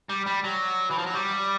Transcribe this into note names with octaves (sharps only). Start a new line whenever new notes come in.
G3
G3
F#3
E3
F3
F#3
G3